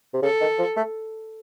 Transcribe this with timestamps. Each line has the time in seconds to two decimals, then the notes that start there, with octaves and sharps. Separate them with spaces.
0.14 C3
0.22 C#3 A4
0.41 D#3
0.58 F3
0.76 A3